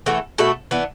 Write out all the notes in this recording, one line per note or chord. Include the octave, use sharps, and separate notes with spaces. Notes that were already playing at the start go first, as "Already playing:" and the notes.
E3 A3 F#4 A4
B2 A3 F#4 A4
E3 B3 D4